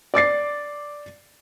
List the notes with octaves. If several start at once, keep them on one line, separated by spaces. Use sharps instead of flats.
D5 D6 A6 C7